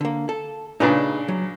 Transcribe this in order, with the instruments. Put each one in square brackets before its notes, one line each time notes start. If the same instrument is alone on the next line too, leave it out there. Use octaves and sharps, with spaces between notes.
[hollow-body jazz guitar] D3 A#3
A4
[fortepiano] A#2 C#3 D4 [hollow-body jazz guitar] D#4 G#4 B4
[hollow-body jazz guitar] F#3